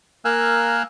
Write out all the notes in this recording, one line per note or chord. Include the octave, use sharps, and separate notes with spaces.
A#3 A#4 F5 G#5 E6 F#6